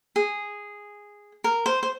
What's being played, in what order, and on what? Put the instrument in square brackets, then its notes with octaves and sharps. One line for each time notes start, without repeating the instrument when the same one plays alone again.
[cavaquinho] G#4
A#4
C5
C5